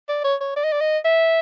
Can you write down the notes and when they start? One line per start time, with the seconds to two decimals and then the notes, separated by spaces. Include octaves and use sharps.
0.09 D5
0.24 C#5
0.41 C#5
0.56 D5
0.64 D#5
0.72 D5
0.81 D#5
1.05 E5